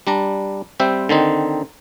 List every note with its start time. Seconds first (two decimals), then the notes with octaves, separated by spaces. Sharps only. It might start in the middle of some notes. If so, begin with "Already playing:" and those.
0.07 G3 D4 A#5
0.80 G3 C4 C5 E5
1.09 D3 D#3 C4 D#4